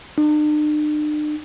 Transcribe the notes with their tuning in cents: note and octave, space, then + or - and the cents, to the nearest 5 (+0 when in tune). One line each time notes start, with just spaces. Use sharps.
D4 +45